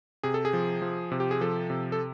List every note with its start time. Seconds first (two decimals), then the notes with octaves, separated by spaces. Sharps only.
0.23 C3 G#4
0.34 A4
0.45 G#4
0.53 F3
0.82 F3
1.12 C3
1.20 G4
1.31 G#4
1.41 F3 A4
1.70 C3
1.92 A4